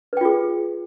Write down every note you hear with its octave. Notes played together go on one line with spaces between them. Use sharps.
F4 G#4 B4 G5